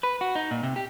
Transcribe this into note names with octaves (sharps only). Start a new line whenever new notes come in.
B4
F#4
D#4
A#2
C3
G4